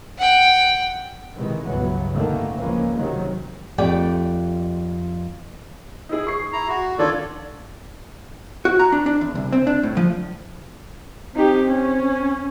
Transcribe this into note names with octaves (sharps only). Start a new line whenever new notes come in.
F#5 G5
C3 D#3 E3 G#3
C#2 G2 B2 E3 F#3 B3
A1 D3 D#3 A3 A#3
C#2 E3 F3 G#3 A#3 C#4
C#2 C3 D#3 F#3 G#3
F2 A3 G4 D5 G5
D#4 E4 G#4
G#4 C#6 C7
E4 A#5
F#4
D#3 D4 F4 A4 D5 G#6
F#4
A#5
D4
D4
E2
C2
C4
D4
A2
F3
C4 D#4 G4
C#4